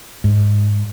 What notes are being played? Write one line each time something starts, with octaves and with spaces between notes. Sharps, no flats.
G#2